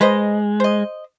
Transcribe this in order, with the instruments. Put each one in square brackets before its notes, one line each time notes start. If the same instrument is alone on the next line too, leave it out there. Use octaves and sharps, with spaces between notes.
[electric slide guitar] G#3 [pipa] B4 C5 D#5
[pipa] C5 D#5